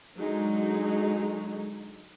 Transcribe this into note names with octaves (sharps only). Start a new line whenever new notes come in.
D3 F#3 G#3 D#4